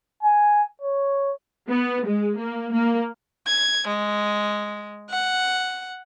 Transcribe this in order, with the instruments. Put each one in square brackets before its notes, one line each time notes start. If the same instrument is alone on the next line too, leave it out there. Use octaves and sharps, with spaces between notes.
[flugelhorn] G#5
C#5
[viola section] B3
G#3
A#3
A#3
[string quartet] G#6
G#3
F#5